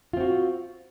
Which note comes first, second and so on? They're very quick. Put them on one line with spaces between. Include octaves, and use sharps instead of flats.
F4 C4 F#4